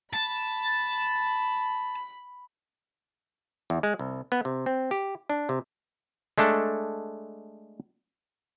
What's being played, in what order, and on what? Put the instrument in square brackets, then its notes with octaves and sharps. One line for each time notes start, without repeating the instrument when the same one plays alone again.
[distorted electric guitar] A5 [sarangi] B5
[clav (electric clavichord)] E2
G#3
C2
B3
C3
C4
G4
D4
C3
G#3 A3 D4 A4